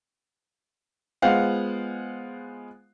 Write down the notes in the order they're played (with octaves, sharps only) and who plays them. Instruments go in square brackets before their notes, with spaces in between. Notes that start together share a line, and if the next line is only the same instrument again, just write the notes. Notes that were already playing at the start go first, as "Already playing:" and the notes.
[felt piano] G#3 B3 F4 C5 F5 F#5